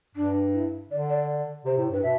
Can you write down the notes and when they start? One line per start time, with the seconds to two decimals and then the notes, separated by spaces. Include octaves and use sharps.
0.15 G2 D4
0.53 E4
0.90 D3 D5
1.09 D5
1.28 D5
1.65 C3 C5
1.78 A2
1.90 G2 B4
2.03 B2 E5